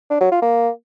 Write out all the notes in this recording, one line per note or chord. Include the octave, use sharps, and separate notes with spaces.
D4
F#3
F4
A#3